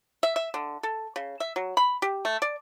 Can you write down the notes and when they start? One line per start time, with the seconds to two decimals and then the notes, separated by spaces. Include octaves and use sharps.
0.23 E5
0.36 E5
0.54 D3
0.83 A4
1.16 C#3
1.40 E5
1.56 F#3
1.77 B5
2.02 G4
2.25 A3
2.42 D5